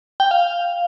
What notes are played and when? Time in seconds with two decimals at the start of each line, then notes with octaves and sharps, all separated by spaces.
0.20 G5
0.31 F5